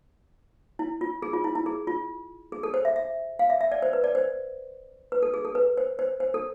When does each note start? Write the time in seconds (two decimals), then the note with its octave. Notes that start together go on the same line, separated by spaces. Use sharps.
0.79 E4
1.01 F4
1.22 G#4
1.33 F4
1.44 E4
1.55 E4
1.66 G#4
1.87 F4
2.52 G#4
2.63 A4
2.74 C5
2.85 E5
2.96 E5
3.39 F5
3.50 E5
3.61 E5
3.72 D5
3.82 C5
3.93 B4
4.04 D5
4.15 C5
5.12 B4
5.23 A4
5.34 G#4
5.45 A4
5.55 B4
5.77 C5
5.99 C5
6.20 C5
6.34 A4